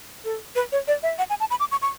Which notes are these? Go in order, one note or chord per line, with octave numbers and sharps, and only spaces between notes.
A4
B4
C#5
D5
E5
F#5
G#5
A5
B5
D6
C#6
C#6